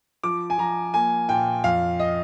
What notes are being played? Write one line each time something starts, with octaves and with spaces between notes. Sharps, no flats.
F3 D6
G#5
F3 A#5
A#3 G#5
A#2 G5
F2 F5
D#5